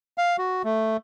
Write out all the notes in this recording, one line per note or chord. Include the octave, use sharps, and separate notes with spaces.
F5
F#4
A3